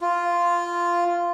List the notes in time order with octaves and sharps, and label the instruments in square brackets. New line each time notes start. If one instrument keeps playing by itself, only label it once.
[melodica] F4